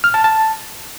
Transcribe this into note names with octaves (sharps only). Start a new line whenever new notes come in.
F6
A5
A5